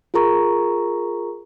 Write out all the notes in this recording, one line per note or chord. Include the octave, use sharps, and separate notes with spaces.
F4 G#4 A#4 A#5 C#6